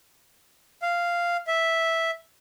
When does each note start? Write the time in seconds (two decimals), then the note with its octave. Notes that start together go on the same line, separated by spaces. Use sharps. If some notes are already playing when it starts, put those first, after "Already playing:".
0.82 F5
1.47 E5